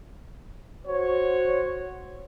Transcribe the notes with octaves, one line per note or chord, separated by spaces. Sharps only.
F#4 C5 C#5